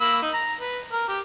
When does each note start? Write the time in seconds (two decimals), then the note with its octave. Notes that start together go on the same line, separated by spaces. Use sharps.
0.01 A#3 B5 E6
0.22 D#4
0.34 A#5
0.59 B4
0.93 A#4
1.09 G4